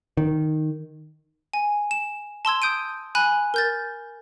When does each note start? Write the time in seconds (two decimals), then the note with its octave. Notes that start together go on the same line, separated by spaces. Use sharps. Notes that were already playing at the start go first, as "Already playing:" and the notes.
0.17 D#3
1.54 G#5
1.91 E7
2.45 A5 C6 E6 G#6
2.62 D#6 G6 D7 D#7
3.15 G#5 B5 F#6
3.54 A#4 G6 A6